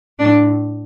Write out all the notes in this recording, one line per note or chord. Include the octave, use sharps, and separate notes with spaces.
A2 D4